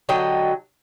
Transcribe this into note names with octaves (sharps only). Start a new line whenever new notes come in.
D3 F#3 D#5 G5